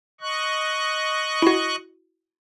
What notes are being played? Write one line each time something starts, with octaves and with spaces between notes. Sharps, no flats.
D#5 C#6 F#6
E4 F#4